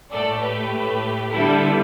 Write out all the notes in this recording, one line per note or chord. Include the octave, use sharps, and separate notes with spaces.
A2 A3 A4 D5
G4 B4
A2 A3
D3 G3 B3 E4 A4